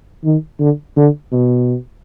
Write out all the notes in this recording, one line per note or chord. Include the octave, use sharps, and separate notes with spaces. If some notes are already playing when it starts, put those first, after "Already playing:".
D#3
D3
D3
B2